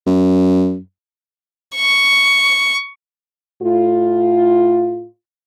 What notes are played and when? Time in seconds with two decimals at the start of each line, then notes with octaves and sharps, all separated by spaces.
0.06 F#2
1.76 C#6
3.63 A2 F4